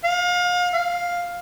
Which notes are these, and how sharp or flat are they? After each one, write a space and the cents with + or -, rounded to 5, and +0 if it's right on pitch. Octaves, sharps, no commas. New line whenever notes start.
F5 +35
F5 +5